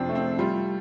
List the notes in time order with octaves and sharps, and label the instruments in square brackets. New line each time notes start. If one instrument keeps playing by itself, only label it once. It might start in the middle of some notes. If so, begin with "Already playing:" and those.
Already playing: [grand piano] F2 C3 D4 [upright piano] F3 C4
[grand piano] A3
[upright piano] C4
[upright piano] G3 [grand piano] F4